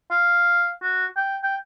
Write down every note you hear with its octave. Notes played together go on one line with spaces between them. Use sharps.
F5
F#4
G5
G5